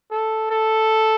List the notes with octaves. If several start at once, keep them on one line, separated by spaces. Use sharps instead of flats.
A4
A4